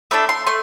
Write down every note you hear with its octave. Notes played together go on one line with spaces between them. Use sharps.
A3 D4 A4 B5
C6
A3 C6